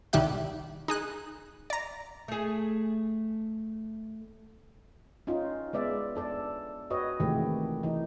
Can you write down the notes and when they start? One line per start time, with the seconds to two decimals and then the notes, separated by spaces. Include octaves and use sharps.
0.13 C2 D#3 G3 G4 E5 F#6
0.88 D#4 G#4 F#6
1.70 D5 A#5
2.28 A3 G#4
5.27 C#4 D#4 F4
5.73 G#3 B3 D5 E5
6.15 D4 A4 D5
6.90 F#4 B4 C#5 D#5
7.20 C3 D#3 E3 G#3 A3 G4
7.83 E3 D#4